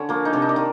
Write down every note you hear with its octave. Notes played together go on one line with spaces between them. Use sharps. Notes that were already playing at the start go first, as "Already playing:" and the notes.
Already playing: D3 C#4
F3 A#3
D#4
C3 D4
D#4
D4
D#3